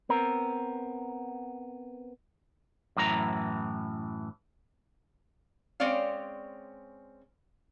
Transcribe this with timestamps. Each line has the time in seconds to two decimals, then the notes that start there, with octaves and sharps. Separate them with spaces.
0.09 B3 C4 A#4
2.97 F#2 A2 E3 A#5
5.80 G#3 C4 C#4 C#5 D5 F5